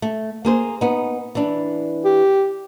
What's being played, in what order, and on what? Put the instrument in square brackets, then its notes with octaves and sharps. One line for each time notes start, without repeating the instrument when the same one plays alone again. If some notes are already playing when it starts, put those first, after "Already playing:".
[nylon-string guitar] A3
A#3 G#4 C5
B3 D#4
E3 D4
[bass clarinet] G4